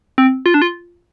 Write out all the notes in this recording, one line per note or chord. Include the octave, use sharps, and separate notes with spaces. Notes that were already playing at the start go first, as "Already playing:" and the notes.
C4
F4
D4
F4